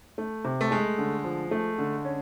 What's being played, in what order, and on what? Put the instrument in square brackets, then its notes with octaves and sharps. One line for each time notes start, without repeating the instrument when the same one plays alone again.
[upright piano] A3
C3
[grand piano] A3
[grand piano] G#3 [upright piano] A3
[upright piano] D3
F3
A3
D3
C#4